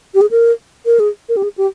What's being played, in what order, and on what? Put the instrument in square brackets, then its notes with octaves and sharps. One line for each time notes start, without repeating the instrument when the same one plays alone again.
[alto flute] G4
G#4
A#4
A#4
G#4
A#4
G4
G#4
G4